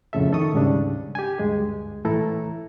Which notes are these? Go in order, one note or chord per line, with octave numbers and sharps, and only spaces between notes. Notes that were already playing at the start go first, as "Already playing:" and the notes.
F2 A2 C#3 A4 E5
D#3 A4 D#5 C#6 D#6
D2 G#2 C#3 G3 D4
G4 G#5
D2 G2 G#3 G#4
A2 E3 A3 E4 A4 A#5